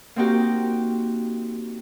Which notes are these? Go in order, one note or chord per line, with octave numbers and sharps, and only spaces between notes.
A#3 C4 D#4 F#4 G4 A#4